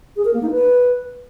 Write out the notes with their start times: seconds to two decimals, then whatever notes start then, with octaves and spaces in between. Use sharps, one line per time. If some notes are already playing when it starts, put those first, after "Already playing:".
0.16 G#4
0.25 A#4
0.34 A#3
0.42 D#4
0.51 B4